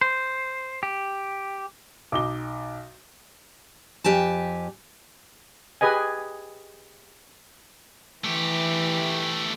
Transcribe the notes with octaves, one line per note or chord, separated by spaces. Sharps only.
C5
G4
B1 D#4 D6 G7
F2 G4 G#5 A5
G4 G#4 B4 D#5 G#5
E3 A3 G4